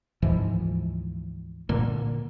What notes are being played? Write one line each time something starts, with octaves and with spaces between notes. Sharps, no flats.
D2 G#2 E3 F3
A#2 D3 A#3